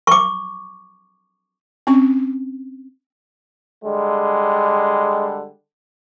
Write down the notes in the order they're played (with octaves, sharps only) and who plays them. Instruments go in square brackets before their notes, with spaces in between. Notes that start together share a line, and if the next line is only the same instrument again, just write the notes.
[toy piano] C#6 D6
[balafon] C4 C#4 C#6
[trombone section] D3 G3 G#3